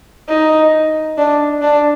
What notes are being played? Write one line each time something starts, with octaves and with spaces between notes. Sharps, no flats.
D#4
D4
D4